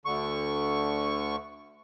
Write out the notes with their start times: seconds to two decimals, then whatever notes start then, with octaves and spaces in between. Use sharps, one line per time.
0.05 D2 D3 C#6